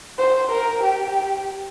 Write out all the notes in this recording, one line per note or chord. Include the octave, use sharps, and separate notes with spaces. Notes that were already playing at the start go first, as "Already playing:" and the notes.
C5
A#4
G4